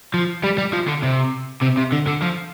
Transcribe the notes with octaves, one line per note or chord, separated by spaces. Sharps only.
F3
G3
G3
F3
D3
C3
C3
C3
D3
D3
F3